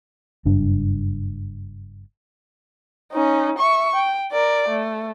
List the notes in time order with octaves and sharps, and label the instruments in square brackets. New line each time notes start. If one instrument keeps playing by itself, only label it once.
[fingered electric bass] F#1 G2 D4
[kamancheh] C#4 D#4
E5 C#6
G5
A#4 D5
A3